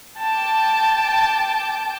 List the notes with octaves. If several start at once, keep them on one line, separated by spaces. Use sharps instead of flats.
G5 A5 D6